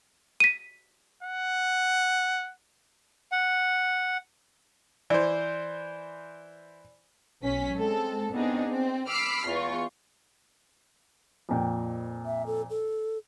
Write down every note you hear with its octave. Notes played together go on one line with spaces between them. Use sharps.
B6 D#7
F#5
F#5
E3 C5 D5
B1 C#4 B6
G#3 C4 A4
B3 C4 D4 D#4 G#4
C4
B5 D6 E6 F6 B6 C7
E2 F4 C#6
F2 A#2 G5
E5
A4
A4